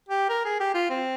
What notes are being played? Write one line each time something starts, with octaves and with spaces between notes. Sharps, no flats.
G4
A#4
G#4
G4
F4
C4